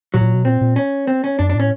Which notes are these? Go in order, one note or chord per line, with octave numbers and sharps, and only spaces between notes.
A#2 F#3
A2
A#2
B2
A#2 C4
A#2
C#4
C4
C#4
F#2 D4
D4
A2 C#4